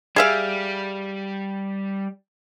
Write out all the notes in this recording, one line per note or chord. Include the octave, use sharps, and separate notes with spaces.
G3 G#4 E5 F5